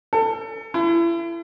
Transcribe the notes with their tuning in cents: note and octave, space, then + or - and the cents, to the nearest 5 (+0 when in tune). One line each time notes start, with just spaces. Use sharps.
A4 +25
E4 +35